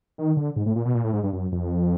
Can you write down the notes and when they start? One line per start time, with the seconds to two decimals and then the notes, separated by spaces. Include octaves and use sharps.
0.18 D#3
0.37 D3
0.56 G#2
0.66 A2
0.76 A#2
0.85 B2
0.95 A#2
1.04 A2
1.13 G#2
1.23 G2
1.33 F#2
1.52 F2